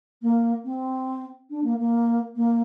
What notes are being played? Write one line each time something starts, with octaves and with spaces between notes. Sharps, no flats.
A#3
C4
D4
A#3
A#3
A#3